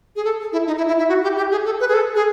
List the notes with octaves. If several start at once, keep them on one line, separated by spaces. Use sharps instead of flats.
G#4
A4
E4
D#4
E4
E4
E4
F#4
G4
G4
G#4
A4
B4
G#4
A4
G#4